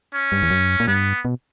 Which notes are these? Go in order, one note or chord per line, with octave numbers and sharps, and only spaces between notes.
C#4
G2
E2
F#2
A#2
G2 B3
B2